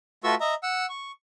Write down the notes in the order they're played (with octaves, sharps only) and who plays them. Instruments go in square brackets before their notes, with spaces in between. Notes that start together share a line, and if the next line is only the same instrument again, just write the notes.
[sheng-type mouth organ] A3 F4 F#4 B4 C#6 E6
D#5 E5 A#5
F#5 E6
C#6